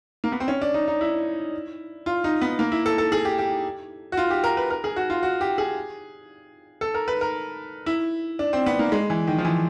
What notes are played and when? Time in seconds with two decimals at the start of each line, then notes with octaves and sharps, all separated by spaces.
0.24 A#3
0.32 B3
0.40 C4
0.48 C#4
0.62 D4
0.74 D#4
0.88 D#4
1.01 E4
2.06 F4
2.24 D#4
2.41 B3
2.59 A#3
2.72 E4
2.86 A4
2.98 A4
3.12 G#4
3.25 G4
3.39 G4
4.12 F#4
4.17 F4
4.30 G4
4.44 A#4
4.57 B4
4.70 A#4
4.84 G#4
4.96 F#4
5.10 F4
5.23 F#4
5.41 G4
5.58 G#4
6.81 A4
6.94 A#4
7.08 B4
7.21 A#4
7.86 E4
8.39 D4
8.53 C4
8.66 B3
8.79 A#3
8.92 G#3
9.10 E3
9.27 D#3
9.38 F3
9.45 E3